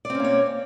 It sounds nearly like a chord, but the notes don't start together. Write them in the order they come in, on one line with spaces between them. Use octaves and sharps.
D5 C4 C#4 A#3 C#5